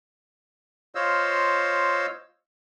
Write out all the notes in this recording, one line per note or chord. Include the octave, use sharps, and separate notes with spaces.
F4 C5 C#5 D#5 F5 E6